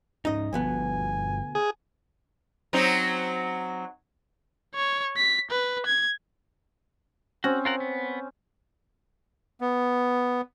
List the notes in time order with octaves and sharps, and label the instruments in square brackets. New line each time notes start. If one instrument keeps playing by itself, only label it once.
[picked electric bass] G#2 C#4 [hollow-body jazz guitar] D#4 D#5
[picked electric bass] G1 G2 F3 [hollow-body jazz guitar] D2 B2 B3 [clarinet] G#5
[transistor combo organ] G#4
[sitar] F#3 C4 D#4
[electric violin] C#5
B6
B4
G#6
[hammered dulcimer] C4 C#4 [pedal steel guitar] F#4
[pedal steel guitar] F4 A#4 F#5
B3
[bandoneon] B3